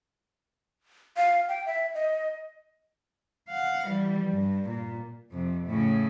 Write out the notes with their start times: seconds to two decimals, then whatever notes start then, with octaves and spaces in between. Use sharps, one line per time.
1.17 F5
1.49 G5
1.66 E5
1.94 D#5
3.50 F5 F#5
3.88 E3 G3
4.29 G2
4.70 A#2
5.31 F2 C3
5.66 A2 C#3